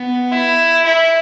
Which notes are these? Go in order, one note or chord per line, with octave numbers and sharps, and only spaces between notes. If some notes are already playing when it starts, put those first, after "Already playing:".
Already playing: B3
E4
E4